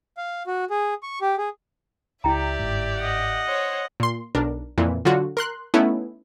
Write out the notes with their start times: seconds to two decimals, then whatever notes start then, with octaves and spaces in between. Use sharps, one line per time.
0.17 F5
0.47 F#4
0.70 G#4
1.03 C#6
1.21 G4
1.38 G#4
2.24 C#2 E4 G4 D5 E5 G5 A#5
2.60 G1 G#2
2.97 D#5 F#5
3.46 C5 C#5
4.00 A#2 C6
4.35 B1 D4 A#4
4.78 F2 A#2 E3
5.05 D3 F#3 F4 F#4
5.37 A#4 C6 F#6
5.74 A3 B3 C#4 D#4 E4